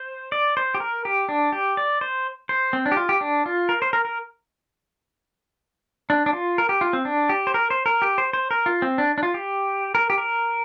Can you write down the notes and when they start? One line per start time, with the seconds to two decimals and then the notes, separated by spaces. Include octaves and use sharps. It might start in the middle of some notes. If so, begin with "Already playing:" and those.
Already playing: C5
0.32 D5
0.57 C5
0.75 G4
0.80 A#4
1.05 G4
1.29 D4
1.53 G4
1.77 D5
2.01 C5
2.49 C5
2.73 C4
2.86 D4
2.92 G4
2.97 F4
3.09 G4
3.21 D4
3.46 F4
3.69 A#4
3.82 C5
3.93 A#4
4.05 A#4
6.10 D4
6.26 D4
6.33 F4
6.58 A#4
6.69 G4
6.81 F4
6.93 C4
7.05 D4
7.29 G4
7.47 C5
7.54 A#4
7.70 C5
7.86 A#4
8.02 G4
8.18 C5
8.33 C5
8.51 A#4
8.66 F4
8.82 C4
8.98 D4
9.18 D4
9.23 F4
9.34 G4
9.95 A#4
10.10 G4
10.18 A#4